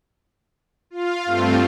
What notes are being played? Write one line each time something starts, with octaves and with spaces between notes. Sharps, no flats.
F4 F5
G2 A3 C4 F4